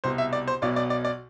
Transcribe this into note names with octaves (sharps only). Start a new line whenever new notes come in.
C2 B2 C5
E5
D5
C5
B1 B2 D5
D5
D5
D5